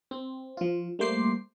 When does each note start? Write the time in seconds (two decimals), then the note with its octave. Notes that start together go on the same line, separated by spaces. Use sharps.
0.11 C4
0.57 F3 F4
0.99 G3 A3 A#3 C5 D6 C7